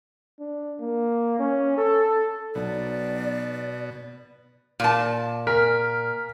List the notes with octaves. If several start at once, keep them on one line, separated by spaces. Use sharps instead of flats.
D4
A#3
C#4
A4
B1 B2 D5
A#2 A5
A#4 G#5 F6 B6